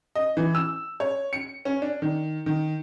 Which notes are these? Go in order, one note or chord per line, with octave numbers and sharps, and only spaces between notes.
D#5
E3
E6
C#5
C#7
C#4
D4
D#3
D#3